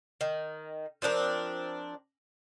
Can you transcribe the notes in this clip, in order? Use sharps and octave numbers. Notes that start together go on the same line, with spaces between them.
D#3
F3 C4 D4 A#4